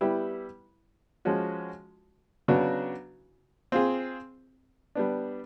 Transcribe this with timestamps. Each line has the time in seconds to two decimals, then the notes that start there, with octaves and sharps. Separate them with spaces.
0.01 G3 B3 E4 G4
1.25 F3 G#3 C#4 F#4
2.48 C#3 F#3 B3 D4 F#4
3.72 C4 F4 G#4
4.95 G3 B3 D4